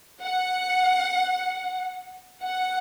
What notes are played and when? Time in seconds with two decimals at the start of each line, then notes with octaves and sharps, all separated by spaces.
0.22 F#5
2.43 F#5